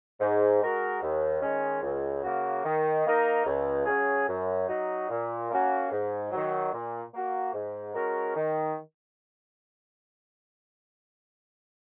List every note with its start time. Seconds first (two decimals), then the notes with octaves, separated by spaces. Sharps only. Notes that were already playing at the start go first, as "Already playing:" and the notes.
0.19 G#2
0.60 G#3 F#4 A#4
1.01 D#2
1.41 D#3 G#3 C#4
1.82 C#2
2.23 C#3 A#3 F#4
2.64 D#3
3.06 A#3 D#4 A#4
3.46 C#2
3.86 C#3 F#3 C#4 G#4
4.27 F#2
4.68 F#3 D#4 F#4
5.09 A#2
5.50 A#3 C#4 F#4
5.91 G#2
6.32 D#3 F#3
6.72 A#2
7.13 A#3 F#4
7.53 G#2
7.94 G#3 C#4 F#4 A#4
8.35 D#3